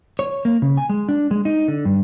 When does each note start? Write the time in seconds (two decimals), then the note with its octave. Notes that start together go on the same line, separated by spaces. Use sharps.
0.19 C#5
0.45 A#3
0.62 C#3
0.77 G#5
0.90 G#3
1.09 D4
1.31 G#3
1.45 D#4
1.68 D3
1.85 G2